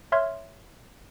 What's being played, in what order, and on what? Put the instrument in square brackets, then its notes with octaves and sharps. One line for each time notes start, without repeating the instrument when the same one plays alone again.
[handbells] C#5 E5 C6 F6 G#6